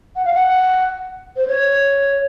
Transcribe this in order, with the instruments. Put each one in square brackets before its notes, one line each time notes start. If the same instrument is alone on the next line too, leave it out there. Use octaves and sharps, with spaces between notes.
[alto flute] F#5
F5
F#5
C5
C#5